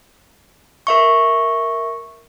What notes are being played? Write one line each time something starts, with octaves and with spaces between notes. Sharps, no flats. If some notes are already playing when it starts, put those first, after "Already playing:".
A#4 E5 C#6